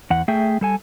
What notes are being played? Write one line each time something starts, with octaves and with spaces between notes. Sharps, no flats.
E2 F#5
A3 G#4 E5 G5
G3 A4 G#5